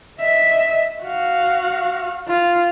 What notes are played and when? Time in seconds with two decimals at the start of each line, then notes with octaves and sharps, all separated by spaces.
0.20 D#5 E5
1.03 F#4 F5
2.28 F4